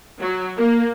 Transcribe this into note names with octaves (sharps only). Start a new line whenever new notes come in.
F#3
A#3